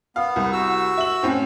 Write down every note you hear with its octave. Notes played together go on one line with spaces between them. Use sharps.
B3 F5
C2
F#4 E6
E5 F#7
A2 C4 C#4